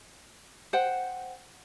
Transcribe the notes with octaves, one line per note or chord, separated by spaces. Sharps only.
C5 F#5 G5